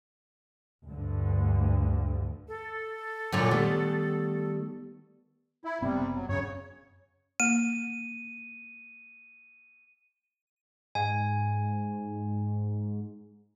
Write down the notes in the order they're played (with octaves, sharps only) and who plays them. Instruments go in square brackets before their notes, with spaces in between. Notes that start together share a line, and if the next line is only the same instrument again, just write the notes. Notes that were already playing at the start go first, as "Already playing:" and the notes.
[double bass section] D2 G2 D3
[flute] A4
[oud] F#2 A#2 D3
[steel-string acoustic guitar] D#3 G3 A3 [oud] B3
[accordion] E4
[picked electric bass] F#1 B3 C4 [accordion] C3 G3
[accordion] F#3
[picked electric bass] F#2 [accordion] C#3 C#5
[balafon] A#3 [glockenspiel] D#7
[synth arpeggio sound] G#2 [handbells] G#5